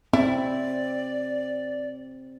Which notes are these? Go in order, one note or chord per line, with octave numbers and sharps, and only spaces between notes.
C4 E4 D5